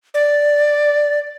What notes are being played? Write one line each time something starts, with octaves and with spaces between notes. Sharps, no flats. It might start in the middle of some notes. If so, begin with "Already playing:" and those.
D5